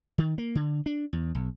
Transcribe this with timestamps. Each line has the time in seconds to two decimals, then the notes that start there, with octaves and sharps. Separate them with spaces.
0.18 D#3
0.38 A#3
0.55 D3
0.86 D4
1.13 E2
1.35 B1